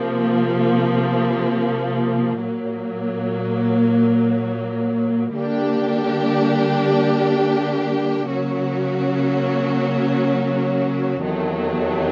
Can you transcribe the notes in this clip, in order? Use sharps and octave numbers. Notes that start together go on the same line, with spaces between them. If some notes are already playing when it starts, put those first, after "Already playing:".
Already playing: C3 F3 A#3
A#2 F#3 A#3
D3 G3 A#3 D4 G4
C#3 F#3 A#3 C#4 F#4
E2 C3 D#3 F#3 A3